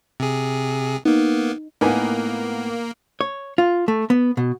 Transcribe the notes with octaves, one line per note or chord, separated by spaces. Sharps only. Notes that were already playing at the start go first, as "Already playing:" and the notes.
C3 G#4
A#3 B3 D#4
A2 A#3 B3 D#4 B4 G#5
C#5
F4
A3
B3
B2